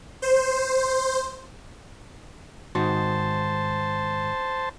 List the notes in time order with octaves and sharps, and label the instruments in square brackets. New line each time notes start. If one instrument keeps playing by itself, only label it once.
[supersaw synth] C5
[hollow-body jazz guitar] G#2 D#3 F#4 [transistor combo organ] C5 A5